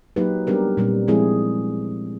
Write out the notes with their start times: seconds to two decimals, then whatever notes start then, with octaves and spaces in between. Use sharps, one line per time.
0.16 F#3 A#3 D#4 G4 B4
0.47 G3 B3 D4 G4 A#4
0.77 A#2 G3 C4
1.08 F3 G#3 C4 E4 G#4